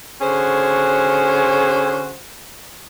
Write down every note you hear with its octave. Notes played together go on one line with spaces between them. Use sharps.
D3 C#4 F#4 G#4 C5